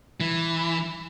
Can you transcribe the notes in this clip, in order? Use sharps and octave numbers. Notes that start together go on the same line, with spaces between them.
E3